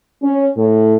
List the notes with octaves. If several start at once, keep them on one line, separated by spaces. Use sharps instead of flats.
C#4
A2